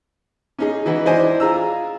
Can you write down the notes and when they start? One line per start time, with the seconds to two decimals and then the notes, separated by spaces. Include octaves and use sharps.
0.59 C#4 D#4 G#4
0.86 E3 D#4 E4 F#4
1.05 D4 E4 C5 D5 D#5 G#5
1.40 F4 G#4 A#5 E6